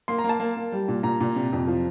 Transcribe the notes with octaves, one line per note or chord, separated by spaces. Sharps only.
A#3 C6
A#5
A#3 A5
A#3
A#3
G3
A#2
A#2 A#5
A#2
C3
F2
F3